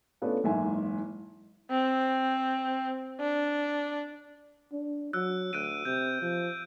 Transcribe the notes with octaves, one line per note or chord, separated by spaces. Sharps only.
A3 B3 C#4 D4 F4
F#1 G#2 E3 E5 G#5
C4
D4
D4
F#3 E6 F#6
D2 F#6 D7 D#7
C3 G6
F3